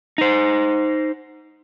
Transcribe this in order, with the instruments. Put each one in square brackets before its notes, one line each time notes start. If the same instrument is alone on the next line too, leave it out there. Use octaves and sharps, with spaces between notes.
[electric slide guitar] D#4 C5